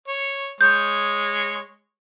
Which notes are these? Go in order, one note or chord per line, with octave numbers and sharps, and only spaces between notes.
C#5
G#3 C#5 G6